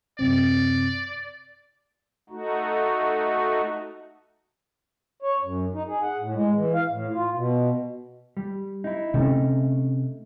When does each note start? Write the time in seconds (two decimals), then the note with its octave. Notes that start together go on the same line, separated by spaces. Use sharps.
0.19 F#2 C3 C4 D5
2.30 A3 D#4 F#4
5.22 C#5
5.41 F#2
5.74 D#4
5.87 G#4
6.02 F#5
6.19 A2
6.34 G#3
6.54 E3
6.74 F5
6.90 A2
7.14 F4
7.34 B2
8.37 G3
8.84 D#4 E4
9.14 C3 A3 C#4 D#4